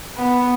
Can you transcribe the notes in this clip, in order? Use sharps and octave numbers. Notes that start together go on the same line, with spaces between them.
B3